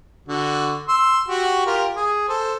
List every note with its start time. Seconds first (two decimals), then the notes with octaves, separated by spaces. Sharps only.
0.28 D3 F#4
0.88 C6 E6
1.28 F#4 G4
1.66 F4 G4 A#4
1.96 G#4
2.28 A4 C5